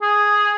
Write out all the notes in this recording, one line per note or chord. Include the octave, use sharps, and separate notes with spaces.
G#4